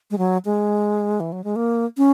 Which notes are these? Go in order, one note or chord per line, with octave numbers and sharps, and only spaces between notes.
G#3
F#3
G#3
E3
F#3
G#3
A#3
C#4